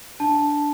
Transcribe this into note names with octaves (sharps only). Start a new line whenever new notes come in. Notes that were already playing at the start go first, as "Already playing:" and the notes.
D4 A5